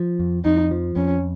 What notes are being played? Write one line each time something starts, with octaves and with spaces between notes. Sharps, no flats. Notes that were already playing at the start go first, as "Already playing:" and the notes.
Already playing: F3
F2
F2 D#4
F3
F2 C#4